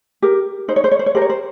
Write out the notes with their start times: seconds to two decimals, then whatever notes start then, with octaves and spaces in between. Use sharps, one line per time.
0.22 G4 A#4
0.68 D#4 C5
0.76 C#5
0.84 C5
0.91 C#5
0.99 C5
1.06 C#5
1.15 G4 A#4 C5
1.22 C#5
1.30 C5